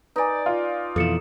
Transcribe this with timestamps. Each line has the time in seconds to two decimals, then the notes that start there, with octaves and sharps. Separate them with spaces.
0.16 D#4 B4 D5 G#5
0.46 F4
0.96 F2 B2 E3 A4 C#7 E7